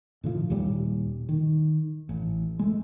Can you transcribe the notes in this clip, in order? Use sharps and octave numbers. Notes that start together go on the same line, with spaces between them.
A2 D3 F3
D#2 A#2 G3
D#3
A1
G#3 A3